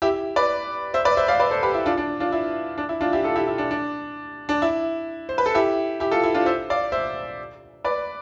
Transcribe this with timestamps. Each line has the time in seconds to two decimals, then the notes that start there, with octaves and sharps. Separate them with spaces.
0.02 E4 G4
0.36 B4 D5
0.94 C5 E5
1.05 B4 D5
1.17 C5 E5
1.28 D5 F5
1.40 B4 D5
1.51 A4 C5
1.63 G4 B4
1.74 E4
1.86 D4 F4
1.97 D4
2.20 D4 F4
2.32 E4
2.78 D4
2.89 E4
3.01 D4 F4
3.13 E4 G4
3.24 F4 A4
3.36 E4 G4
3.48 E4
3.58 D4
3.71 D4
4.49 D4
4.62 E4
5.29 C5
5.38 B4
5.46 A4
5.55 E4 G4
6.00 E4 G4
6.11 F4 A4
6.24 E4
6.34 D4 F4
6.46 C5 E5
6.70 D5 F5
6.92 C5 E5
7.84 B4 D5